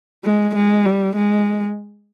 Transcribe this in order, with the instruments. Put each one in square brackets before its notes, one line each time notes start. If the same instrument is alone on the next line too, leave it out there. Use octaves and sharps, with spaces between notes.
[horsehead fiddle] G#3
G#3
G3
G#3